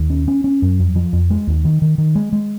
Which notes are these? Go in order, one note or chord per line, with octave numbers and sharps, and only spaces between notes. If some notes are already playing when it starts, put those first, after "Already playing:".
Already playing: D#2
C#4
C#4
C#4
F#2
F2
F3
F2
G#3
D#2
D#3
D#3
D#3
G#3
G#3